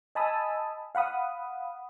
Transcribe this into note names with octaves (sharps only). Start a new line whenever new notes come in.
D#5 G#5 A5 B5 D#6 E6
F5 F#5 B5 D#6